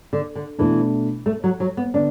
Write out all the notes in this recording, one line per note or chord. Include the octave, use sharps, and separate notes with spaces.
D3
D3
B2 E3 A3 D4
A3
F#3
F#3
B3
D3 B3 D4